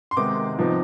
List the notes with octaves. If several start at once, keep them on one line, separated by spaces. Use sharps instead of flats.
C6
C3 D#3 G#3 B3 D#4 D6
C3 F3 B3 D#4